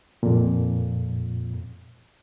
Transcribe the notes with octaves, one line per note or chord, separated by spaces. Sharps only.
F2 A#2